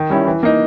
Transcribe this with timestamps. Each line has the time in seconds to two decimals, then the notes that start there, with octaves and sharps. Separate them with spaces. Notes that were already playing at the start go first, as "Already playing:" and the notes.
Already playing: D#3
0.10 G3 C#4 E4
0.27 E3
0.43 A#3 D#4